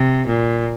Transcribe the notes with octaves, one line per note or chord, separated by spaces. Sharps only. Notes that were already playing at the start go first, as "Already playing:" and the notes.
Already playing: C3
A#2